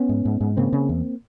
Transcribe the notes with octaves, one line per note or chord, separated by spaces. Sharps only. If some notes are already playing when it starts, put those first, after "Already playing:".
Already playing: B3 C#4
G#2
G#2
G#2
C#3 A#3 C4
C#3
E2